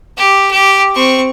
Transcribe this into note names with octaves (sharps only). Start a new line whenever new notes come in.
G4
G4
C4 C#6